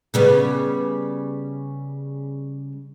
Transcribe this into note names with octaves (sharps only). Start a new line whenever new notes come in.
C#3 G3 B3